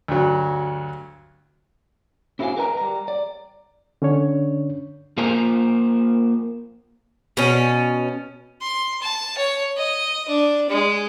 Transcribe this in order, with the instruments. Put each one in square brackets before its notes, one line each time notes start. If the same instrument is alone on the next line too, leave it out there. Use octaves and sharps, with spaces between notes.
[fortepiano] D2 G2 F#3
[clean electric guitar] C#4 E4 F#4 C5 F5 G#5
A#4 B4 D#5 F#5 A#5
G3 A#5
D5
[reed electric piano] D3 C#4 D4 C#5
[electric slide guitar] A#3 F4 A#4 C5 G#5 A#5
[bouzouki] B2 C#4
[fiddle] C6
A5
C#5
D#5
D4
G#3